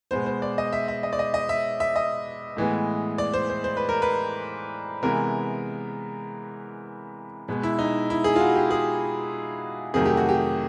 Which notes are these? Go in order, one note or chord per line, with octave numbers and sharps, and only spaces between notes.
B2 G#3 B3 C5
C5
D5
D#5
E5
E5
D#5
D5
D#5
D#5
E5
E5
D#5
A2 E3 G#3 B3
D5
C5
C5
C5
B4
A#4
B4
C3 E3 G#3 B3 A#4
B2 G#3 B3
E4
D#4
E4
G#4
F4
F#4
G4
G#4
F2 C3 D#3 F#3 A3 G#4
G4
F#4
G4